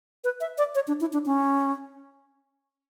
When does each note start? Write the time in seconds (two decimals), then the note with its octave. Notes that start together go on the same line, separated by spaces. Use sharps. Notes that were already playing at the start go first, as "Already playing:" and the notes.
0.24 B4
0.41 E5
0.58 D5
0.75 C#5
0.88 D4
1.01 E4
1.13 D4
1.26 C#4